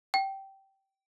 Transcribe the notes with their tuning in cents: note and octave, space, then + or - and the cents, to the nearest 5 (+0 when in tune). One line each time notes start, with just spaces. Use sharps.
G5 -15